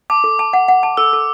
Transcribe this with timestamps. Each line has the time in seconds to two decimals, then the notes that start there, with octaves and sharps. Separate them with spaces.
0.10 A5 D6
0.24 A4
0.39 A5
0.53 F#5
0.68 F#5
0.83 A5
0.97 A4 E6
1.13 A4